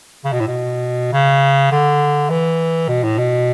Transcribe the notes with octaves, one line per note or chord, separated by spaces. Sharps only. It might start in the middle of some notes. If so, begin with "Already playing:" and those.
C#3
B2
A2
B2
C#3
D3
E3
B2
A2
B2